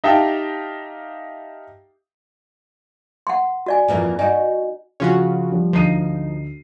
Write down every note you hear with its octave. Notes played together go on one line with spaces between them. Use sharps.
D#4 G4 E5 F5 G5 A5
F#5 C6
F#4 D5 G#5
F2 A#2 E3
D#4 F#4 D5 G#5
C#3 F3 C#4 F4 F#4
F3 G3
D2 F3 D#4 C7 D#7